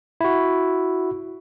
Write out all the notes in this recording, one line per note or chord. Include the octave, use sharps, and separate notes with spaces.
E4 F#4